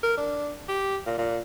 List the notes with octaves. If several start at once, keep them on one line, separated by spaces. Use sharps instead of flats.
A#4
D4
G4
A#2
A#2